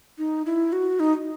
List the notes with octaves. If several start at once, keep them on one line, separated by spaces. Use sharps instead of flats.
D#4
E4
F#4
D#4